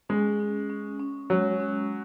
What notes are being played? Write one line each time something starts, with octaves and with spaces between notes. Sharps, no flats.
G#3 C#4
C#4
C#4
C#4
F#3 G#3
C#4